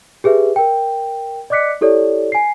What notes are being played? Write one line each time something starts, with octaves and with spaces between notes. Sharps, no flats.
G4 G#4 B4 E5
A#4 G5
D5 D#5 D6 F#6 B6 C#7
E4 G4 A4 C#5 D5
G#5 C7